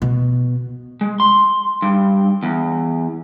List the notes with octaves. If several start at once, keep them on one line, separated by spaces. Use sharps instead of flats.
B2
G#3
C6
G2
E2